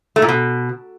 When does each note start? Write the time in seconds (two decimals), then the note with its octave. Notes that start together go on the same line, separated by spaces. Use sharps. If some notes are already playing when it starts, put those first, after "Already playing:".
0.16 A3
0.22 A#2
0.29 B2